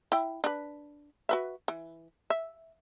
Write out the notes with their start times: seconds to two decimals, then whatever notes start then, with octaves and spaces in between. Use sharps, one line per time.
0.12 E4 G5
0.44 D4 B4
1.29 F#4 B4 E5
1.68 E3
2.30 E5